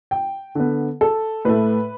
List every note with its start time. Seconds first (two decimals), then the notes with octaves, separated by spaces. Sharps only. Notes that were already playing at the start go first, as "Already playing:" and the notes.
0.11 G5
0.55 D3 B3
1.01 A4
1.45 A2 A3 B4